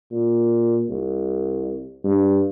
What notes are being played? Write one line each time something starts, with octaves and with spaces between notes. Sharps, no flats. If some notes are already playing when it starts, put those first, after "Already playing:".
A#2
C2
G2